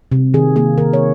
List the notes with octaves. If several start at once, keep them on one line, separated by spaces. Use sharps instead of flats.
C3
D#3 G#4
A#3 G#4
D#3 A#4
C#5